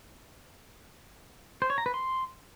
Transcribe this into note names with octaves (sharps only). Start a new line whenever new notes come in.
C5
C#5
A#5
B4
C6